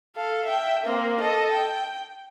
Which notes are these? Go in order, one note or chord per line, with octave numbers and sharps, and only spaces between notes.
A4 F5
E5 G5
A#3 C4
A4 D#5
G5